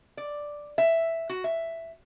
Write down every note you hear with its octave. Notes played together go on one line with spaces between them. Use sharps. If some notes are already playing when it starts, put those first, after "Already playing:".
D5
E5
F#4
E5